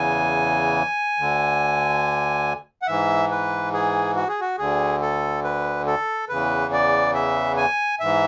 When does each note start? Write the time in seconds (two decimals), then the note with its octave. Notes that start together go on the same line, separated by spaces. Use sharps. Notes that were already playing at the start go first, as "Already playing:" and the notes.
Already playing: E2 C#3 E3 G#5
1.17 D2 D3
2.82 F#5
2.87 G#2 E3 E5
3.31 B4
3.73 G#4
4.15 F#4
4.28 G#4
4.41 F#4
4.58 D2 D3 G#4
5.02 A4
5.44 B4
5.87 A4
6.29 E2 C#3 E3 B4
6.73 D5
7.14 E5
7.57 G#5
8.00 G#2 E3 E5